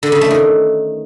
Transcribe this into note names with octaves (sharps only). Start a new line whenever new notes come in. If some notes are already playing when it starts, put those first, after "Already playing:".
D3
C#3
A3
D#3